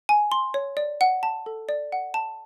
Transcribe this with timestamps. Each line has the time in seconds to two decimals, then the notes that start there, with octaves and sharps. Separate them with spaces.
0.09 G#5
0.32 C6
0.54 C#5
0.77 D5
1.01 F#5
1.23 A5
1.46 A4
1.69 D5
1.92 F#5
2.14 A5